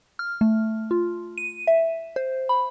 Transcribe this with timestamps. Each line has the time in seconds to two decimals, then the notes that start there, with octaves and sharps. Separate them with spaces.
0.19 F6
0.41 A3
0.91 F4
1.38 D#7
1.67 E5
2.16 C5
2.49 B5